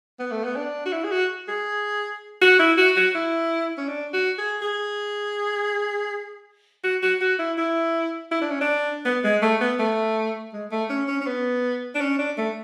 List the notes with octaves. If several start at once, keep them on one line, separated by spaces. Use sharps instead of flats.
B3
A3
B3
D4
F#4
E4
G#4
F#4
G#4
F#4
E4
F#4
F#4
E4
C#4
D4
F#4
G#4
G#4
F#4
F#4
F#4
E4
E4
E4
D4
C#4
D4
B3
G#3
A3
B3
A3
G#3
A3
C#4
C#4
C#4
B3
D4
C#4
D4
A3